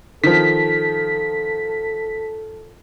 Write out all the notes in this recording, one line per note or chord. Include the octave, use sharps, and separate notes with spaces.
D#3 F3 A4 B6